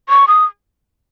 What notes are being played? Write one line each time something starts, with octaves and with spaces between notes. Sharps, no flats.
C#6
D#6